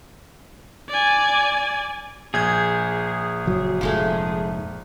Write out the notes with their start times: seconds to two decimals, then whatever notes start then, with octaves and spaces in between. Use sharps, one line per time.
0.89 D5 G#5
2.34 A#1 G#4 G6 G#6
3.46 F#1 F#3
3.81 F1 G#2 F3 G#3 A3